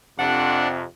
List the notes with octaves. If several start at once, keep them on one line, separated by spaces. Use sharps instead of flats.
F2 C3 D4 F#5